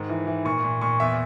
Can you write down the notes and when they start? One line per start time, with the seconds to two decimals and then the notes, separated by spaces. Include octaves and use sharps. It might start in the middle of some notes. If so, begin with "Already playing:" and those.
Already playing: G#2 D#3
0.10 E3
0.27 E3
0.45 A#2 C#6
0.64 A#2
0.81 A#2 C#6
1.00 E2 E5